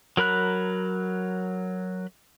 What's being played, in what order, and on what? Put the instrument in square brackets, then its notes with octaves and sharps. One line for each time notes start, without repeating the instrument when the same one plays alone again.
[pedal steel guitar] F#3 A#4 B5 F#6